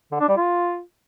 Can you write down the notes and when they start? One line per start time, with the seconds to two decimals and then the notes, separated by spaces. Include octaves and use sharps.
0.12 D3
0.20 D4
0.29 G3
0.37 F4